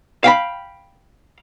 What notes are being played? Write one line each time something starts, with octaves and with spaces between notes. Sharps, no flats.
F5 G5 B5